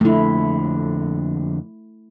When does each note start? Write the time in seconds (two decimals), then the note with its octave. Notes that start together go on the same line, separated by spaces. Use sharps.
0.01 F2 D3 A3 E4